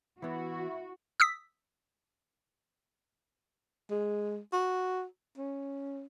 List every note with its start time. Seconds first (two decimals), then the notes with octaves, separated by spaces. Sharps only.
0.22 E3 B3 E4 F#4
1.20 D#6 E6 B6
3.91 G#3
4.53 F#4
5.37 C#4